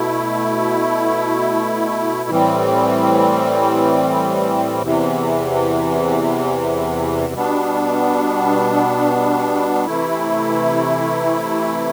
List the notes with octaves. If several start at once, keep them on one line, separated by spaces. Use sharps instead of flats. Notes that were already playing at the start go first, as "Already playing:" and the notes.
Already playing: B2 A3 E4
A2 E3 G3 C4
E2 C3 E3
B2 G3 B3 D4
C3 E3 A3 E4